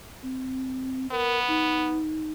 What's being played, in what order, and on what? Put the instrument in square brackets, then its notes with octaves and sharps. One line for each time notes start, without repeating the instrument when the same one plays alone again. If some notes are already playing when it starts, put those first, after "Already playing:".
[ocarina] C4
[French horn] B3 [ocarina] A#4
[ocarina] D#4